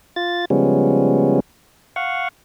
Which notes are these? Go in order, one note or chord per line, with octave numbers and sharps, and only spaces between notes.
F4 A6
C#3 F3 G3 G#3 B3 C#4
F5 F#5 C#6